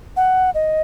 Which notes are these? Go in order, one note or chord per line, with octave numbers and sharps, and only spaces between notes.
F#5
D#5